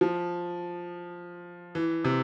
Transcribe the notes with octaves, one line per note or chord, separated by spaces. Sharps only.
F3
E3
C3